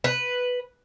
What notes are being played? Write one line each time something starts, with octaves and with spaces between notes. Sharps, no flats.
B4